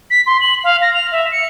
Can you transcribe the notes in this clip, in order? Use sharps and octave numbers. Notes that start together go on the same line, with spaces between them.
B6
C6
F#7
F5
A#6
F7
E5
C#7